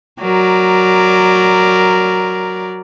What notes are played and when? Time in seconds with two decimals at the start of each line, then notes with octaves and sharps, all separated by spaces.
0.21 F#3 A#4 D5